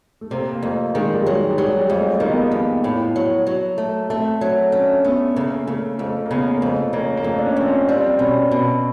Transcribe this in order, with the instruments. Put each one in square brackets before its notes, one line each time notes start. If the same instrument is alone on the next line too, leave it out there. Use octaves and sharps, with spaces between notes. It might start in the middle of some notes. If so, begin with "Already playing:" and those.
[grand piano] A3
[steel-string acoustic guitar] C3 [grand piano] A#3
[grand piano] A#3
[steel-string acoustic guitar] F2 [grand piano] A3
[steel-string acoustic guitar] D#3 [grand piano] G#3
[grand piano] G3
[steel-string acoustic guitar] F#3 [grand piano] G#3
[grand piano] G3
[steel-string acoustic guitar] F#3 [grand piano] G#3
[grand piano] G3
[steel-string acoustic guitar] F2
[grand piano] A3
[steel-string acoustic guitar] D#3 [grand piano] A#3
[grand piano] B3
A#3
[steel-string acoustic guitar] F2 [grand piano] B3
[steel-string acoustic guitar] A2
F#3
F#3
A3
[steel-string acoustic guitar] A3 [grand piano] C4
[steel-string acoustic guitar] F#3
[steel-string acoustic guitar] A3 [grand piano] C#4
[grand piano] D4
C#4
[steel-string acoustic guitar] A3 [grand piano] B3
[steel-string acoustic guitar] C#3 [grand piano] A#3
[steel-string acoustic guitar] C#3 [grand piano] A3
[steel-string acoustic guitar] F2 [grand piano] A3
[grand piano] A#3
[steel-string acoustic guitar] C#3 [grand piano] B3
[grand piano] A#3
[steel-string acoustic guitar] F2 [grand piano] A3
[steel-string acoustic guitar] C#3 [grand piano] A#3
[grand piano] A#3
[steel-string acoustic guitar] F2 [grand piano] A3
[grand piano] D4
C#4
[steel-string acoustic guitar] F2 [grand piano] C4
[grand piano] C#4
[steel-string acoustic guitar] G3 [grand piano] C4
[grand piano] C4
[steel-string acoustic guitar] B2 [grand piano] C#4
[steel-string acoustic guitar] B2